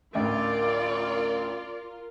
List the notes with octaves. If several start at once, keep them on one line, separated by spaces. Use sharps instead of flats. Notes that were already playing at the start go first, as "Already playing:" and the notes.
A1 D2 F4 A#4 D5